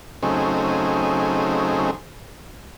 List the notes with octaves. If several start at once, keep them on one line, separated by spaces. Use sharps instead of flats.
C#3 F#3 A3 C4 D#4 G#4